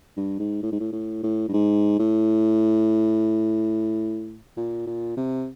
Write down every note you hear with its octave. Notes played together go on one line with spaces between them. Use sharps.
G2
G#2
A2
G#2
A2
A2
A2
G2
G#2
A2
A#2
A#2
C3